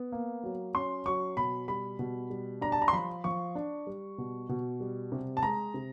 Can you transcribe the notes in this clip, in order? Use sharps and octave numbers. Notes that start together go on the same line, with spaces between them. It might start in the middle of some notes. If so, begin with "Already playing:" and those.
Already playing: B3
A#3
F#3
C#4 C6
F#3 C#6
B2 B5
G3 B5
B2
G3
D4 A#5
A5
A#5
C6
F3 B5
F3 C#6
D4
G3
B2
B2
G3
C3
A5
G#3 A#5
C3